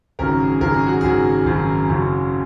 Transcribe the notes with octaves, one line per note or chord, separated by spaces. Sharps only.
G#1 F#2 C#3 F#3 A#4
G#4
G#1 F#2 C#3 F#3 A#4
G#4
F#4
G#1 F#2 C#3 F#3 G#4
G#1 F#2 C#3 F#3
F#1 F#2 C#3 F#3